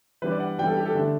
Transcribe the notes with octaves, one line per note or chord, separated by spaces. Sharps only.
E3 G3 D4 B4
D5
F#5
E3 G3 D4 G5
A4
G4
A4
D3 A3 D4